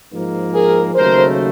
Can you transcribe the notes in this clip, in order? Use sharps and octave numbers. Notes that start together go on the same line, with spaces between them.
G#2 F3 A#3
G#4 A#4
D#2 C#3 F#3 A3 A#4 C5